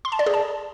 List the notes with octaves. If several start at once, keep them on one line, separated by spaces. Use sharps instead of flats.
C6
A5
D5
G#4
A5